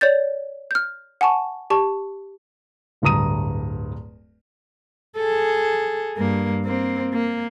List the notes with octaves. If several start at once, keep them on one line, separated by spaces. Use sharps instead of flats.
C#5 D5 G6 A6
F6 G6
F#5 G#5 A5 C#6
G4 A5 C#6
D1 D2 G2 A#5 D#6 D#7
G#4 A4
G2 A#3
A#3 C4
A#3